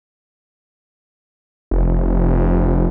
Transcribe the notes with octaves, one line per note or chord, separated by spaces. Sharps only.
F1